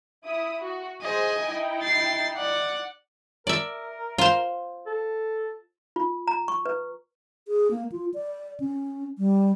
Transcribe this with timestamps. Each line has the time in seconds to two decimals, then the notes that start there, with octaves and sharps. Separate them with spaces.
0.24 E4 E5 D#6
0.61 F#4
1.02 G#4 C5 D#5 G#5
1.40 D#4 E4 G5
1.82 A6 C7
2.36 D5 F#5
3.47 A#4 D5 E5
4.18 F4 C5
4.86 A4
5.96 F4
6.28 A#5
6.48 C#6
6.66 B4
7.48 G#4
7.71 A#3
7.92 F4
8.14 D5
8.60 C#4
9.18 G3